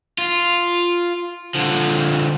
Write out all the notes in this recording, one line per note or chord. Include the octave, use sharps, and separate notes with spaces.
F4
D3 F3